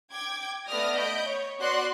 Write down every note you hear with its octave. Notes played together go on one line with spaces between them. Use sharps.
G5 D6 G#6
A3 B3 D5 D#6 F6 A#6
D#5 B5 G6 D7
C#5
B3 F#4 D5 F#5 C6 F#6